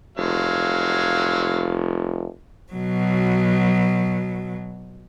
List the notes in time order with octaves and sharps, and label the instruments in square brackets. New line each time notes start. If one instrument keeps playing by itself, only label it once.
[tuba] F1 [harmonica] F#3 G#3 F5
[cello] B2 F#3